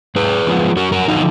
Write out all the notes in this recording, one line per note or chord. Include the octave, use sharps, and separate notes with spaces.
G#2 G#4 B4
F3 G#3 B3
F#2 F#4 A#4
F#4 A#4
D3 F3 D#4 F#4